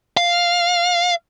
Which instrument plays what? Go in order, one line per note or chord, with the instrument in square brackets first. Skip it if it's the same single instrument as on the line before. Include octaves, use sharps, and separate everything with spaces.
[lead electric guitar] F5